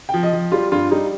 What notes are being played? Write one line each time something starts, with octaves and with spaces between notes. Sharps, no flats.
F3 G5
D#5
F3
G3 F4
G2 F4
G3 D#4